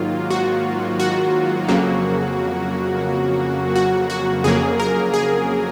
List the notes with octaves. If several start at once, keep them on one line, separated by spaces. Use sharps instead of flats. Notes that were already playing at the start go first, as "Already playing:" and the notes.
Already playing: G#2 D#3 F#3 A#3 F4
F#4
F#4
F2 C#3 F#3 A#3
F#4
F#4
F2 C#3 F#3 A#3 G#4
A#4
G#4